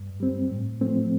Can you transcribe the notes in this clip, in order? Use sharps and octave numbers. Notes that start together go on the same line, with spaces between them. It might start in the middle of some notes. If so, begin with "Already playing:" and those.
Already playing: G2
G3 C4
A2
F3 A3 C4